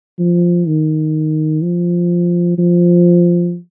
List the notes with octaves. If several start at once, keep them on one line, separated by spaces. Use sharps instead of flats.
F3
D#3
F3
F3